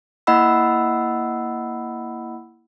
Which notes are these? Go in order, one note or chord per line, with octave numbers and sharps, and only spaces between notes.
A#3 E4 D#5 F#5 B5 E6